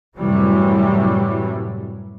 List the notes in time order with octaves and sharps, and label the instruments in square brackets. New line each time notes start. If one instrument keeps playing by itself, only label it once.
[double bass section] F#2 A2 C3 E3 F#3 G3